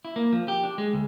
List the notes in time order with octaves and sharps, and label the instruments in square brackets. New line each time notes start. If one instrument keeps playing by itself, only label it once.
[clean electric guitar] E4
A#3
F3
G4
D4
G#3
D2